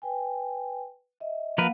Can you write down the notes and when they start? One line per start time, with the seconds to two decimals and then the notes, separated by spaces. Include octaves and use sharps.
0.02 B4 G5 G#5
1.20 D#5 E5
1.58 F3 A#3 A#4 B4 F5 F#5